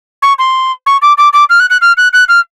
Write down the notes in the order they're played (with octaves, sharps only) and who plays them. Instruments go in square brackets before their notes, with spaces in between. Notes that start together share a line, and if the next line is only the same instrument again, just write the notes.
[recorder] C#6
C6
C#6
D6
D6
D6
F6
F#6
F#6
F6
F#6
F#6
F6